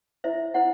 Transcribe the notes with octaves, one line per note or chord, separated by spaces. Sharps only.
E4 C5 E5
E4 C5 F#5